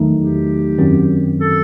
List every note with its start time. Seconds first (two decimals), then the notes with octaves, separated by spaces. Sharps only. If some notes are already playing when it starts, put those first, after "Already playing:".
Already playing: E2 D#3 F#3 A3 D#4
0.17 G4
0.78 F#2 D#3 F#3 C4
1.40 A4